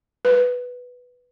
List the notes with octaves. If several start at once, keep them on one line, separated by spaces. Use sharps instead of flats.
B4